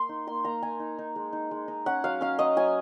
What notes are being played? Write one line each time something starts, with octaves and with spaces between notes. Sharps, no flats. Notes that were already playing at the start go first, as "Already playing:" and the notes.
Already playing: A#3 C6
D#4
A#3 C6
A#3 A#5
A#3 G#5
D#4
D#4
G#3
D#4
G#3
D#4
C#4 F#5
F#3 F5
C#4 F5
F#3 D#5
F#3 G#5